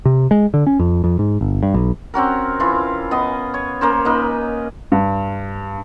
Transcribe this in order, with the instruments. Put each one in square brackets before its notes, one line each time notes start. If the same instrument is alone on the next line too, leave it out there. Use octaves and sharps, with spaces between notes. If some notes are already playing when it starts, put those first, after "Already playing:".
[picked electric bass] C3
G#3
D3
C#4
F2
F2
G#2
G1
G2
B1
[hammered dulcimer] C4 C#4 F#4 A#4
E3 F4
B3 D#5
C#5
A#3 C#4 A#4 C5
A#3 D#4 B4
[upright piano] G2